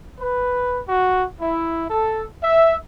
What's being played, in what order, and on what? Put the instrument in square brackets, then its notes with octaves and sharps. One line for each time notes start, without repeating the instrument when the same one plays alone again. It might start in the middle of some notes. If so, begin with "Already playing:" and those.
[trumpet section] B4
F#4
E4
A4
E5